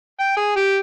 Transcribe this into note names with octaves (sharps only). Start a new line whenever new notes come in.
G5
G#4
G4